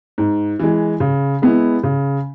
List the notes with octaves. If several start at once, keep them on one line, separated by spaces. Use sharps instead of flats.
G#2
E3 G#3
C#3
G#3 B3 E4
C#3